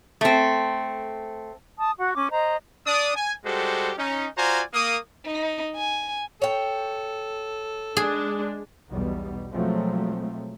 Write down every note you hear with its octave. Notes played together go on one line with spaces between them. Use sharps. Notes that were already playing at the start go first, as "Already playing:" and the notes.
A3 C4
A5 D#6
F#4 F#5
C#4 D6
C5 D#5 A#5
D4 D5 D#6
G#5
G3 G#3 F#4 G4 A4 C5
C#4 D#4
F4 F#4 C5 D5 G#5 A#5
A#3 D#6
D#4
G#5
A4 C#5 G5
G#3 D4 G#4
B1 E2 B2 G3
B2 F3 F#3 G#3 A3 C4